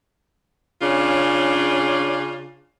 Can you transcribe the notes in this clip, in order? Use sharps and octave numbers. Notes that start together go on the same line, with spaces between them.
C#3 C#4 D4 F4